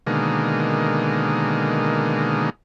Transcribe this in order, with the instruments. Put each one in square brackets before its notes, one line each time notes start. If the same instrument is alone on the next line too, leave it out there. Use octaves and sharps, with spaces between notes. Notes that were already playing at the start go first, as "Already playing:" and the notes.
[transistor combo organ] B2 D3 D#3 G#3 A#3